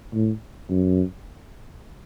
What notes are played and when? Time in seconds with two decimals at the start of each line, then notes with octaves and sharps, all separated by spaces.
0.14 A2
0.70 F#2